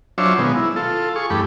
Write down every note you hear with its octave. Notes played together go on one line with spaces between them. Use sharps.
F#3 D4 F4 C5 C#5 E5
B2 D#3 G#3 B3
E4
F4 A4
G#4 C#6
E2 G2 A3 G4 B5